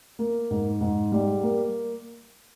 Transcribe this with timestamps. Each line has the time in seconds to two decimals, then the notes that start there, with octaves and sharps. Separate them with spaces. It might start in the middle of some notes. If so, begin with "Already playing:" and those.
0.19 A#3
0.50 G#2
0.81 G#2
1.12 G3
1.43 A#3